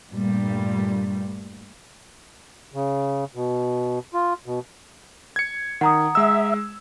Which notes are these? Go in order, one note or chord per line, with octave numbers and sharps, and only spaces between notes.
G2 A#2 G3 A3
C#3
B2
F4
B2
G#6 C#7
D#3 F#5 A#5 D#6
G#3 E5 E6